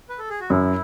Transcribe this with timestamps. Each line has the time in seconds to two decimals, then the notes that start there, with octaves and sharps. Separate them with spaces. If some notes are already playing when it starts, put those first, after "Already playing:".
0.09 B4
0.19 A4
0.29 G#4
0.40 F#4
0.50 F#2 E4